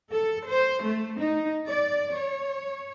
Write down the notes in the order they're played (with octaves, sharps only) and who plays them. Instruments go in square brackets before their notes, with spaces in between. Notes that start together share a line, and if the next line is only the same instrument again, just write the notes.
[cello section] A4
C5
A3
D#4
D5
C#5